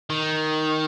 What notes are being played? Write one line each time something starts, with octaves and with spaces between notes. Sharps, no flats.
D#3